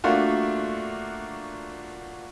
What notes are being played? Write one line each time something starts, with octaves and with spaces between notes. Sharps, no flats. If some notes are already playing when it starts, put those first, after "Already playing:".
A3 A#3 D4 F4 F#4